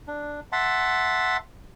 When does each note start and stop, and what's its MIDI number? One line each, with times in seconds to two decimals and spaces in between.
0.07 0.40 62
0.52 1.37 76
0.52 1.37 78
0.52 1.37 81
0.52 1.37 84